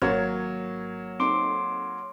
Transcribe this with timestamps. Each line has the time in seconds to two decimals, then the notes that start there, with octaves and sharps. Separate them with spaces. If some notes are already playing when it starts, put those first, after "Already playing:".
0.02 G#1 F#3 A#3 A#4 C#5 A6
1.20 C4 D#4 A4 C6 D6 D7